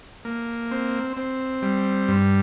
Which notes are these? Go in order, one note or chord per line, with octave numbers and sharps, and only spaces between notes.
A#3
C4
C4
G3
G2